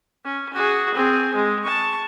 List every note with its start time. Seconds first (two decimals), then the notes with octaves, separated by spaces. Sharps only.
0.24 C#4
0.54 F#4 G#4
0.95 C4 G#4
1.35 G#3
1.64 A5 C#6